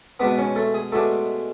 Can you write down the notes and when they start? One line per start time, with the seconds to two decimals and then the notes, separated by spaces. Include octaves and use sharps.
0.20 B2 G#3 B3 D4 B4
0.38 C#4 C#5
0.56 A3 A4
0.74 G#4
0.92 B2 G#3 A3 D4 A4